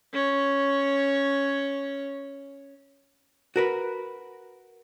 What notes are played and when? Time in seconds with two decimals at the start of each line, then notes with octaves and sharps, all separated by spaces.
0.13 C#4 C#5
3.56 F#4 A#4 B4